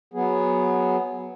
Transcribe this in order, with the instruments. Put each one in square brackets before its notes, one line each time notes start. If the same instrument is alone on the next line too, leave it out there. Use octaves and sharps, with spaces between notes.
[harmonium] F#3 B3 G#4